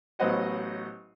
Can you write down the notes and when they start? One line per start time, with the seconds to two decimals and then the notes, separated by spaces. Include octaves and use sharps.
0.19 A1 F#3 B3 C5 D#5 F#5